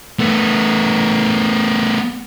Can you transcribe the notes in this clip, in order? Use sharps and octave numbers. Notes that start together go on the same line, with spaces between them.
A3 B3